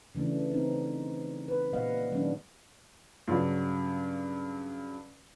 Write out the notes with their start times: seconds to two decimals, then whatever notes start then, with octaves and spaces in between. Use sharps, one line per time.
0.15 C#3 E3 A3 D4
0.51 B3 C4 D#4
1.48 B4
1.72 A#2 G3 B3 D#5 F5 F#5
2.12 D#3 F#3 G#3 C#4 D4
3.28 G2 C#3 F#3